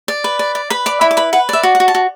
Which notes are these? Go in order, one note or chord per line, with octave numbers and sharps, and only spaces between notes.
D5
B4
D5
D5
B4 B5
D5 D6
E4 B5
D6
B4 B5
B4 F#5
D5 E5
F#4
F#5
F#4
A5
F#4